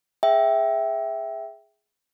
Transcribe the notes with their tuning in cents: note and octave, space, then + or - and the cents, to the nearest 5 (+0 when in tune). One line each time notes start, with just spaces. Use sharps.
G#4 +0 E5 +0 G5 +0